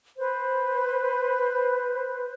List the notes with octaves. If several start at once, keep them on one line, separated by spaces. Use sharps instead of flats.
B4 C5